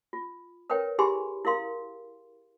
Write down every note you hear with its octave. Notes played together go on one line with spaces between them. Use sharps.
F4
A#4 B4 C#5 E5 G5
E4 G4 G#4 G#5 B5 C6
E4 A#4 F5 C6